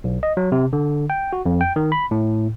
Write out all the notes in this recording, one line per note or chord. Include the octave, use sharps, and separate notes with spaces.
B1
D#5
F#3
C3
D3
G5
F#4
F2
G5
D#3
B5
A2